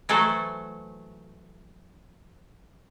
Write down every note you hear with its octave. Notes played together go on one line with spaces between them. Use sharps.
E3 F#3 A3 A4 C5